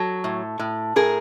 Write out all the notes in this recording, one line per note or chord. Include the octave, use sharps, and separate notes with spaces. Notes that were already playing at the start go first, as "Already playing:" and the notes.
Already playing: F#3 A4
A2
A2
A2 G#4 A#4